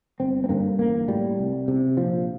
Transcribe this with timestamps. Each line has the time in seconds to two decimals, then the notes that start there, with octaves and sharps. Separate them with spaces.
0.20 G1 C4
0.44 C4
0.49 G2 D3 A#3
0.79 A1 A#3
1.08 A2 G3
1.39 C2
1.68 C3
1.97 A#1 F3